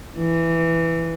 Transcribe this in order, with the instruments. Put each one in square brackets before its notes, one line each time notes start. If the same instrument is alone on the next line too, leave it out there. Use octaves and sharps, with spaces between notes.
[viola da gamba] E3